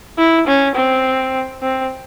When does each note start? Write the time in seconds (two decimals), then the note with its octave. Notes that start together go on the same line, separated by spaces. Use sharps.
0.18 E4
0.47 C#4
0.76 C4
1.62 C4